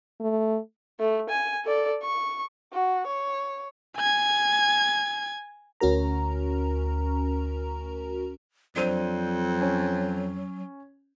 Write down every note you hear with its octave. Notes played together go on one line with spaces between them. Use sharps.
A3
A3
G#5
A4 D5
C#6
F#4
C#5
G#5 G#6
D2 C#4 F#4 A#4 A#5
F2 F#3 D4 C5 D#7
C#4